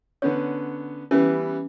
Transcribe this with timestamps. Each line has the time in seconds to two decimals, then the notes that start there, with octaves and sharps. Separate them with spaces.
0.22 D3 B3 C#4 C#5
1.11 E3 G3 B3 C#4